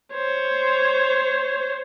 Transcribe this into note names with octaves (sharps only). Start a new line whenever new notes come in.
C5 C#5